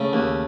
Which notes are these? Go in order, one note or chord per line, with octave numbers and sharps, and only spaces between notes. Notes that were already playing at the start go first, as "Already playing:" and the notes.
Already playing: C#3 A3
D#2